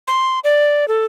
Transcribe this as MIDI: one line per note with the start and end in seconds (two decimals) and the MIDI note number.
0.07 0.39 84
0.44 0.88 74
0.88 1.06 69